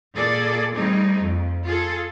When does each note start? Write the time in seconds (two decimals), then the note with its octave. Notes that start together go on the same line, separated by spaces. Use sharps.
0.14 A#2 G#4 A4 D5
0.75 G3 A3 C4 D#4 G#4
1.22 F2
1.65 F4 G#4 A4